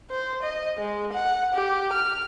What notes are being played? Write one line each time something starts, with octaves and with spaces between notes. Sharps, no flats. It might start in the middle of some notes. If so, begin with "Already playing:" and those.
C5
D#5
G#3
F#5
G4
F6